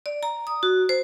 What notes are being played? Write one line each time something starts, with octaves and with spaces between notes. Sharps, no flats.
D5
A#5
D#6
F#4
C5